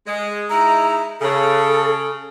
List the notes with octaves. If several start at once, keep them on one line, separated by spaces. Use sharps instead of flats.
G#3
G#3 D#4 E4 A#5
C#3 A4